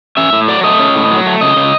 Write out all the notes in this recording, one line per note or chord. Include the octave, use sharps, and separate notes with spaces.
C#4 E5
A2
F#3 D5
A3 D#5
C#4
A2
F#3
A3
C#3 D#5
C#3